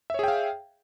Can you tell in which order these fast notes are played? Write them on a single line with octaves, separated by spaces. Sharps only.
E5 C#5 G#4 G5 F5